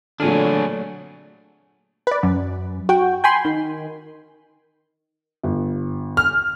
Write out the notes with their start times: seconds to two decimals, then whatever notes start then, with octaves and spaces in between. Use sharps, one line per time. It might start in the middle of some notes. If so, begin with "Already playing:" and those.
0.20 A#2 D3 F#3 A3 C4 D4 G#4 F6
2.07 B4 D5
2.23 F#2
2.89 F#4 G5
3.24 G5 G#5 B5 C6
3.45 D#3
5.43 G1
6.17 F6